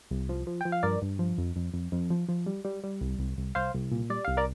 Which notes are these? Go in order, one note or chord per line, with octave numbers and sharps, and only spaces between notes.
C2
F3
F3
F3 G5
F5
G2 A#4 D5
G2
F3
F2
F2
F2
F2
F3
F3
G3
G3
G3
C2
C2
C2
C2 C5 F5
C2
A#2
G3 D5
C2 F5
A#4 D5